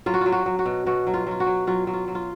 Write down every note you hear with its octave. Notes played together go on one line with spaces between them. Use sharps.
F#3 F4
F#4
F#3 F4
F#4
F#3
F#4
B2
B2 F#4
F#3
F4
F#3 F4
F#4
F#3
F#3 F4
F#3
F4
F#3
F4